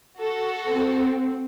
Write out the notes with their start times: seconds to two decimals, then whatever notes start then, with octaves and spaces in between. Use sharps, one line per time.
0.18 F#4 A4
0.67 C4